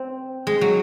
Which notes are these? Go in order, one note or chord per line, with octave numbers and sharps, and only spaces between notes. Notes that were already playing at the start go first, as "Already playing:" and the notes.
Already playing: C4
G#3
F#3